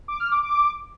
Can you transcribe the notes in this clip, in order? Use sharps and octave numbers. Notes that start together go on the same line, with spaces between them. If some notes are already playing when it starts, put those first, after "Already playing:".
D6
F6
D6
D6